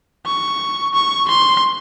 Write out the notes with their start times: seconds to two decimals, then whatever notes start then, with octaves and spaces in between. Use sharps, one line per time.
0.26 C#6
0.94 C#6
1.29 C6